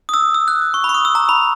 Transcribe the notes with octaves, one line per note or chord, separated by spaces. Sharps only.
D#6
E6
E6
F#6
D#6
C#6
B5
C#6
D#6
E6
A#5
B5